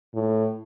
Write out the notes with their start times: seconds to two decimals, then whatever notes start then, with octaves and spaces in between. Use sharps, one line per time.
0.14 A2